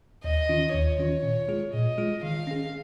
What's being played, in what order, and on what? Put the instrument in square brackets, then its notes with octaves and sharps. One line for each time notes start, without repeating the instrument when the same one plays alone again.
[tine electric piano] D#2 [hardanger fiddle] D#5
[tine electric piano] D#3 C#4 F4
[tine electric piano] D#2 [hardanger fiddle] C#5
[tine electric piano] D#3 C#4 F4
A#2
G#3 F4 G#4
[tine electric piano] A#2 [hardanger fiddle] D#5
[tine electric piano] G#3 F4 G#4
[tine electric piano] D#3 [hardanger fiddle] F5
[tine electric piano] C#4 G#4